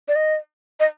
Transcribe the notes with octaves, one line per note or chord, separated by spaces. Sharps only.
D5
D#5
D#5